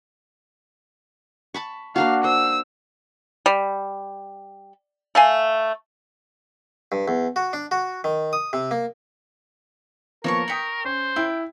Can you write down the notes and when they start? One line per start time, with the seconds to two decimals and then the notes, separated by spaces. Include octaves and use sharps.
1.54 A5 B5 C#6
1.96 A#3 D4 F#4 F5
2.24 C5 E6
3.46 G3
5.15 A3 F5 G#5
6.92 G2
7.08 E2
7.36 F#4
7.53 D4
7.71 F#4
8.04 D#3
8.33 D#6
8.53 C3
8.71 A#3
10.24 F3 A#3 B3 A#4 C#5 A5 C#6
10.48 G5 C#6 D#6 B6 C#7
10.85 C#4 C5
11.16 E4 G5